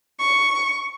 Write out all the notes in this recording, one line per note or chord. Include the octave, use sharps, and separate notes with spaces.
C#6